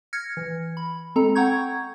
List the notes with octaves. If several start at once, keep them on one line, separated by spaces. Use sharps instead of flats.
F6 G#6 A#6 C#7
E3
B5
G#3 C4 A4 A#5
F#5 G5 A#5 C#6 G6 G#6